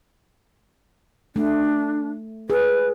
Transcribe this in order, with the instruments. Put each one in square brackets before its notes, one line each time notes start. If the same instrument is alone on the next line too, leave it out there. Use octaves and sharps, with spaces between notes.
[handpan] A3 [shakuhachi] D4
[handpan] G#4 [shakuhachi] B4